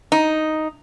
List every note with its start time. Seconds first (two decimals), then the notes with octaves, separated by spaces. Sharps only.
0.12 D#4